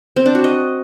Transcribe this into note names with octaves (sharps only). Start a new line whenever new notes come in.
C4
D4
F#4
D#5